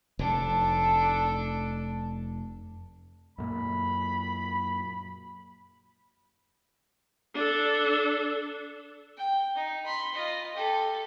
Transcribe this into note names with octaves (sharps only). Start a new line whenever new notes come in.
F1 D4 A4
F#2 A#2 B5
D4 A4
G5
D#4
B5 C6
F4 D#5
G4 A4